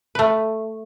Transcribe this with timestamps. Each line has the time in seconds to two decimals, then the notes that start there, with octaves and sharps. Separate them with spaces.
0.15 A3 B4